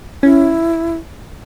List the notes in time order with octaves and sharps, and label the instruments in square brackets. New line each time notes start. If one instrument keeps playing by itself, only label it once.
[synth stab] C#4 [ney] E4